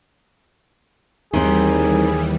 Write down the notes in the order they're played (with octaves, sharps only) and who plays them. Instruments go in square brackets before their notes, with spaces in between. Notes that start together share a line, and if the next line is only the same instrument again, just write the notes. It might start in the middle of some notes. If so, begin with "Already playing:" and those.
[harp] D#2 [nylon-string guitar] D#3 C4 D#4 [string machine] E3 G3 [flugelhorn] G#4